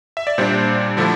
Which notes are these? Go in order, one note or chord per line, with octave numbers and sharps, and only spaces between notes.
E5
D5
A#2 G3 D4 C5
D3 F3 A3 E4